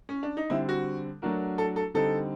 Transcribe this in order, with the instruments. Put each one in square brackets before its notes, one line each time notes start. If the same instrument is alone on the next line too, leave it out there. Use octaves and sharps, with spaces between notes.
[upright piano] C#4
D4
D#4
[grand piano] D3 G3 C4 [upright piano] E4
[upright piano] F#4
[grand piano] F#3 A3 D4 F#4 A#4
[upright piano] A4
A4
[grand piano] D3 G3 C4 D#4 [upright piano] A4